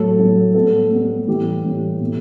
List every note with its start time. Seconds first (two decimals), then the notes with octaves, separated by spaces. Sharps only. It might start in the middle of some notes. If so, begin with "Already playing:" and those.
Already playing: A2 F#3 A3 A4
0.19 A2 F#3 A3
0.54 A2 G3 B3 A4
0.91 A2 G3 B3
1.28 A2 E3 G3 G4
1.64 A2 E3 G3
2.00 B2 A3